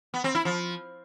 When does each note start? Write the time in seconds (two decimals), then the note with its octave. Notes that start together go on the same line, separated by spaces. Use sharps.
0.14 B3
0.24 C4
0.35 E4
0.45 F3